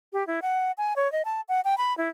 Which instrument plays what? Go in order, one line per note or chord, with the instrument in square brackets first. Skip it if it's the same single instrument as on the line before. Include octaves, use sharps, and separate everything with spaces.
[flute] G4
E4
F#5
G#5
C#5
D#5
A5
F#5
G5
B5
E4